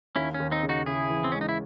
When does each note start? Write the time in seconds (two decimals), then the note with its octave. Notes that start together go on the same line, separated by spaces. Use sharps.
0.16 D#2 C#4 E4
0.34 C#4
0.40 D#2
0.51 C4 D#4
0.63 C#3
0.69 D#4 F#4
0.86 C#3 E4 G#4
1.10 E3
1.24 C4
1.32 G#3 C#4
1.41 D#4
1.49 E4